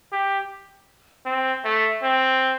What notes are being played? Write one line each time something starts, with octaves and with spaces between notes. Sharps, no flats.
G4
C4
A3
C4